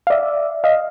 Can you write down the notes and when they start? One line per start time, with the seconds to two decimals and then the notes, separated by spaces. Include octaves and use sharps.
0.07 F5
0.10 D5 E5
0.64 D#5 F5